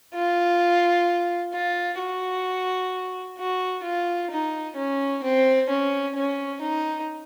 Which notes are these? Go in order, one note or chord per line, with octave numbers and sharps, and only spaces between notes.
F4
F4
F#4
F#4
F4
D#4
C#4
C4
C#4
C#4
D#4